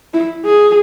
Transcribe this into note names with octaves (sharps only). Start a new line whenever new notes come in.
E4
G#4